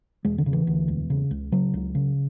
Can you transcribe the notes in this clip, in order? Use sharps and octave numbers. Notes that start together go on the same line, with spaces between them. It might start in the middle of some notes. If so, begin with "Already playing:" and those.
E1 G#3
D3
C#3
E3
D2
E1
C#3
C#2
C#3 F#3
C#2
C#3